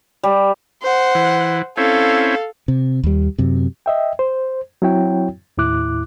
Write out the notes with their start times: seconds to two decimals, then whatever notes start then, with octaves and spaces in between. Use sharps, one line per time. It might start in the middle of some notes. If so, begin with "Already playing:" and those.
0.23 G3
0.82 C5 F#5
1.15 E3
1.77 C4 C#4 E4 A4 F5
2.68 C3
3.04 D#2 G3
3.39 F#2 C3
3.86 D#5 E5 G5
4.19 C5
4.82 F#3 C4 E4 F#4 C#5 G5
5.58 D#2 A2 E4 D6 F#6